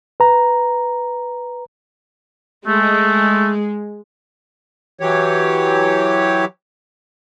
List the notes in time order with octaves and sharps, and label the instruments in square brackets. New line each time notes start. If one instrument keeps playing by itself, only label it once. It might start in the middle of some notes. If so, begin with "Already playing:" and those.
[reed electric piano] B4 A#5
[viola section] G#3 [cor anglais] A3
[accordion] E3 F#3 G4 C#5